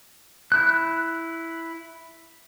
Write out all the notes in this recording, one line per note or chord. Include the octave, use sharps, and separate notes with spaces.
E4 F#6